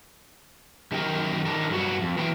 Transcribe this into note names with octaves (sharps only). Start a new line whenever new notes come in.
F#2 D#3 G4 A#4 G5
D#3 D4 A4 A#4
G2 F#3 G3 F#4
F2
E3 F#3 B3 G5